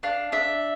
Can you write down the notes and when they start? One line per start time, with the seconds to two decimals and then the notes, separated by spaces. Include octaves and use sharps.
0.03 D4 F5
0.32 D4 E5